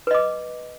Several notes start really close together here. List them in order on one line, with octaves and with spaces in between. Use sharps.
B4 D#5 D6